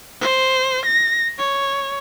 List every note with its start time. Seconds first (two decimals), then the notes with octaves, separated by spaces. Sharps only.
0.21 C5
0.86 A#6
1.39 C#5